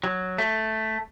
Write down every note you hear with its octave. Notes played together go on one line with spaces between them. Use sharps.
F#3
A3